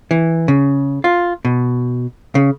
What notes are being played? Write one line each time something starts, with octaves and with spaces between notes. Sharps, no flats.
E3
C#3
F4
B2
C#3